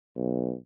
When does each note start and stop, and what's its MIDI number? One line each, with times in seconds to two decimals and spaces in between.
0.17 0.53 35